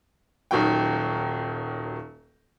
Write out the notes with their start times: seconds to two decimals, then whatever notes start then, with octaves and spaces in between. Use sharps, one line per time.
0.51 D#1 D#3 F#3 G4 G5